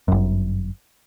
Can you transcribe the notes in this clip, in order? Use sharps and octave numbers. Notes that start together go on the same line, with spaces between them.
G1 F#2